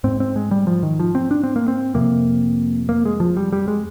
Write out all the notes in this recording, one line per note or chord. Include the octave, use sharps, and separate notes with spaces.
G#2 C4
C4
G#3
G3
F3
D#3
F3
C4
D4
C4
A#3
C4
F2 C3 A#3
A#3
G#3
F3
G3
G3
G#3